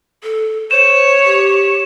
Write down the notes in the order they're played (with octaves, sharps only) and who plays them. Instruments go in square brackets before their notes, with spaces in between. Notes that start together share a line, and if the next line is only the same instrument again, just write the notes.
[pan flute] A4
[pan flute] C5 [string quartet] C#5 [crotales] E7
[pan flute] G4